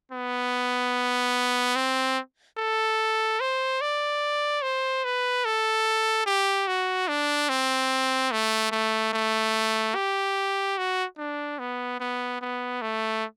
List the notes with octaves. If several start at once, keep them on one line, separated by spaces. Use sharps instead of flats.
B3
C4
A4
C5
D5
C5
B4
A4
G4
F#4
D4
C4
A3
A3
A3
G4
F#4
D4
B3
B3
B3
A3